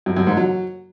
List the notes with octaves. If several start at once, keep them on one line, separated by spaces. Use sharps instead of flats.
F#2
F#2
G#2
F#3